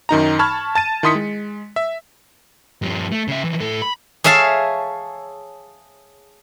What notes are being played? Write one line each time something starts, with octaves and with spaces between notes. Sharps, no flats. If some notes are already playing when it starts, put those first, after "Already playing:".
F#2 D#3 D#4 A#5
A5 B5 C#6 F6 G#6
A5 A6 D#7
D#3 E4 C6 D#6 B6 C#7
G#3
E5
G2 F3
A3
C#3 E5
E3 F3
A2 A4
B5
G#4 C#5 E5 F5 A5